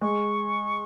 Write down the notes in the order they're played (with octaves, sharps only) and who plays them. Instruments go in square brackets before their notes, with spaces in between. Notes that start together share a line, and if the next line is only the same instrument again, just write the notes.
[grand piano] G#3 [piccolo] C#6